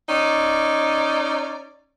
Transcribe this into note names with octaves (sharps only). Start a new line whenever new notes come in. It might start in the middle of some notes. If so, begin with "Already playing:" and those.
C#4 D#4 D5